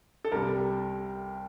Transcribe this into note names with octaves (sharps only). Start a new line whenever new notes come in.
A4
C2 C3 G3 A#4